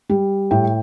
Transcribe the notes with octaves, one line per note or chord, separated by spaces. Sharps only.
G3
A2 G5